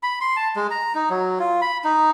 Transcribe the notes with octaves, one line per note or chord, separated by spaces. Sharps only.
B5
C6
A5
G#3
A#5
D#4
F#3
F4
B5
D#4